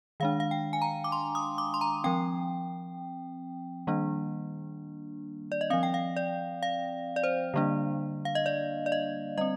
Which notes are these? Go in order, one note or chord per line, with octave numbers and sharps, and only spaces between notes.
D#3 G#3 D4 F5
F5
G5
G#5
A#5
D6
C6
D#6
D6
C6
A#5
F3 C4 G5
D#3 G3 A#3 D4
D5
D#5
F3 C4 F5
G5
F5
D5
F5
D5
C5
D3 G3 A#3 D4
F5
D#5
D5
D5
D#5
G3 C4 D#5